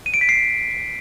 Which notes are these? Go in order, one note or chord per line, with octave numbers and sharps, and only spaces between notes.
D#7
D7
B6
C7